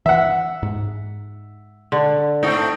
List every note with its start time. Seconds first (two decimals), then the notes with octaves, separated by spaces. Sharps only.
0.06 E3 E5 F#5
0.63 G#2
1.92 D3
2.43 G#2 A3 C4 D#4